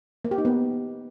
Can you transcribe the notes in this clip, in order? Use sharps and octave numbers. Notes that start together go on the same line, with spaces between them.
A#3
G4
D#4
B3